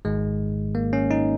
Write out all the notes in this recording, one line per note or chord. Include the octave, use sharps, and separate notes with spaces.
G#1 G#2 D#3 G#3
A#3
C#4
D#4